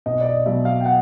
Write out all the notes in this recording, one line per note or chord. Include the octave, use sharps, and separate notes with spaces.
B1 D#5
D5
D#5
B2 F#3 E5
F5
G5
F#5